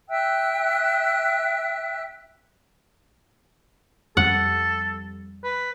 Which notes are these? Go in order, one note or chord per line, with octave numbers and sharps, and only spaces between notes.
E5 G5 E6 F#6
F2 G3 A4 F#5
B4